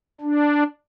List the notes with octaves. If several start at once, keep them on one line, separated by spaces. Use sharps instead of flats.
D4